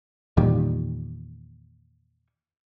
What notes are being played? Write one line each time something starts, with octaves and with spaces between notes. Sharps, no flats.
E2 A#2 D#3 G3